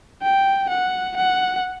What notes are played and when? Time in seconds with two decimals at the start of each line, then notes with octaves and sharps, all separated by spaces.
0.22 G5
0.70 F#5
1.17 F#5